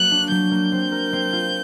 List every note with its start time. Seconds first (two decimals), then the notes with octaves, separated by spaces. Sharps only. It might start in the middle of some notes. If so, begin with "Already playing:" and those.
Already playing: F#3 A#3 F#4 F#6
0.11 D4
0.31 F#3 G6
0.51 A#3
0.72 C4
0.92 A#4
1.13 C4
1.33 F4